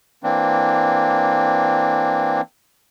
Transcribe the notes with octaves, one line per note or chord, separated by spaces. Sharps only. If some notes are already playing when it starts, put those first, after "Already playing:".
E3 A#3 C4 D4